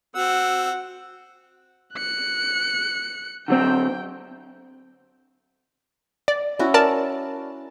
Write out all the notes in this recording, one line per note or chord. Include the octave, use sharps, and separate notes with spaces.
C4 F#4 F#5 E6
F#6 C#7
D3 F#3 C4 G5
D5
C#4 E4 F#4
A#4 D5 A5